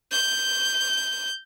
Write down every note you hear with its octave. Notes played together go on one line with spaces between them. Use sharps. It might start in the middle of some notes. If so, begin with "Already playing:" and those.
G6